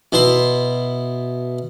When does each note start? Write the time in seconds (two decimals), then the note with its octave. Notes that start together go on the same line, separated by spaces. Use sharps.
0.12 B2 E4 C6